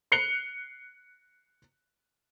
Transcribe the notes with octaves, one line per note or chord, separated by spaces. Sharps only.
F#6 C7 C#7 F7 G7